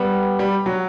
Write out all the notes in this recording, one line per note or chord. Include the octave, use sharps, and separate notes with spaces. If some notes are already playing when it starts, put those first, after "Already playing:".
Already playing: G3 B3
G3
F#3